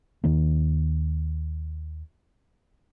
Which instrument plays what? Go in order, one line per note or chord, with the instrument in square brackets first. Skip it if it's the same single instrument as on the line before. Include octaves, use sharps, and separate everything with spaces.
[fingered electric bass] D#2 D#3 A#3